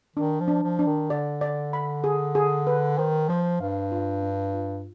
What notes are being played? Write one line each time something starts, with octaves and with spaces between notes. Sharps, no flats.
D#3 D4
F3
D4
F3
D4
D#3
D3 D5
D5
B5
G#4
G#4
B4
D#3 C5
F3 C5
G2 F5
F4
D4
F4